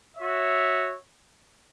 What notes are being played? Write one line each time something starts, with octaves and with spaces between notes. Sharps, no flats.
F#4 C#5 E5